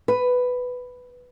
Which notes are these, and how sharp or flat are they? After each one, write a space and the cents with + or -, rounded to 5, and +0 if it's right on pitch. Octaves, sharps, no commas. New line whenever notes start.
B4 +5